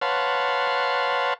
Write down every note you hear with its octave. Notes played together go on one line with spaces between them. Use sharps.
B4 C#5 F5 F#5 A5 C6